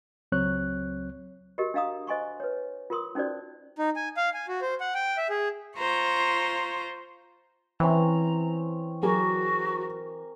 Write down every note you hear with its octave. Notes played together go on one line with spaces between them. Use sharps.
C#2 F#3 C4 C#5 F#6
F#4 G4 A#4 D#5
D4 D#5 F5 A#5 D#6
C5 D#5 G#5 C6 C#6
B4 C#5
F4 A#4 C6 D#6
C#4 D#4 F#4 C5 D5
D#4
G#5
F5
G#5
F#4
C5
F#5
G5
E5
G#4
F4 C5 A#5 C#6
E3 C4 C#4 A#5
F#3 F#4 G#4 A#4 G#5 D6